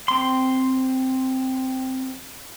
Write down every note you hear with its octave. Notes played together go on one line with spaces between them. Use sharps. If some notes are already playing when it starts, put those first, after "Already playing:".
C4 C6